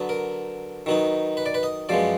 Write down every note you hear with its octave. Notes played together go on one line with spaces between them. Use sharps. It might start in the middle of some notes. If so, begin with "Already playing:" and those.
Already playing: D3 F#3 B3
A#4
D#3 F#3 B3 D#4
B4
D5
B4
D#5
F#2 F3 G#3 B3 D5